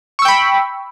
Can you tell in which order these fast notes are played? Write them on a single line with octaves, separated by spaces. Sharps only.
C#6 E6 G5 B5